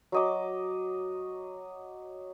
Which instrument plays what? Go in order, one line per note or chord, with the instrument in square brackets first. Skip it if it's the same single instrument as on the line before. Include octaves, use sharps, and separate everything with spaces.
[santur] F#3 D#5 D6